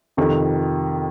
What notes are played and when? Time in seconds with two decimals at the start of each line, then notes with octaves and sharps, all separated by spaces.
0.17 F2 C3 D#3